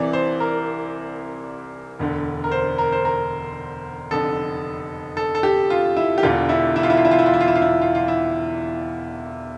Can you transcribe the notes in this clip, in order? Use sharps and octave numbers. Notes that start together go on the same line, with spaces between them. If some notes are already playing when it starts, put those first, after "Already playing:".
Already playing: C2 C3 E3 D5
C5
A#4
E1 D2 D3
A#4
C5
A#4
C5
A#4
F1 F2 D3 A4
A4
A4
G4
F4
E4
G4
E1 E2 D3 F4
E4
E4
F4
E4
F4
E4
F4
E4
F4
E4
F4
E4
F4
E4
F4
F4
E4